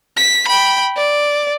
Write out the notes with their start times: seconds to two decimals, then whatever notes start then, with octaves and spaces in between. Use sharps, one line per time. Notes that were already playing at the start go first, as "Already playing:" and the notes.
0.17 B6
0.48 G5 B5
0.97 D5